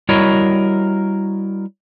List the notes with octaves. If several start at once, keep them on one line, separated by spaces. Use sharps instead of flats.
G3 E4 F#4 A#4 C#5 D#5